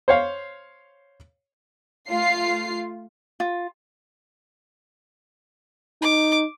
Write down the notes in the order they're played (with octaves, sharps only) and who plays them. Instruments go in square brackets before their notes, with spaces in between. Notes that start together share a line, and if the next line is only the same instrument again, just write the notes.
[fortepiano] C5 C#5 F5
[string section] A3 F4 C7
[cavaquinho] F4
[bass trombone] D#4 [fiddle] D6